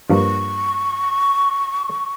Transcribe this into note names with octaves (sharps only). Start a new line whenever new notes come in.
G2 F3 A#3 C#6